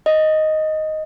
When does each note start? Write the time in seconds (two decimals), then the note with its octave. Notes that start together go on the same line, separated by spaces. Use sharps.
0.06 D#5